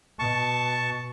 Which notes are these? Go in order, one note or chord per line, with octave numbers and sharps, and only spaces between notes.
B2 A5 C#6